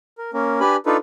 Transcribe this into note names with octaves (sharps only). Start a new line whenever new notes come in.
A#4
A#3 C#4 A#4
D4 G4 B4 G#5 B5
D4 D#4 F4 A4 B4